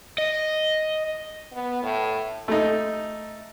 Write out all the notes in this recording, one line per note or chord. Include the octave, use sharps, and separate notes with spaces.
D#5
B3
A2
A3 D#4